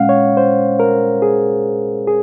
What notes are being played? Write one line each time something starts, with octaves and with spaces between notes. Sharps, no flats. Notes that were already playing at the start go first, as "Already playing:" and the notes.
Already playing: A#2 G#3 C#4 F5 F#5
C#5
C5
A#4
G#4
G#4